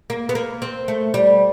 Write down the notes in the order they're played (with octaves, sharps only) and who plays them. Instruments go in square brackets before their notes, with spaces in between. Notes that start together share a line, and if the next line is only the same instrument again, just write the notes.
[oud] A#3
B3
A#3
C4
A3
G3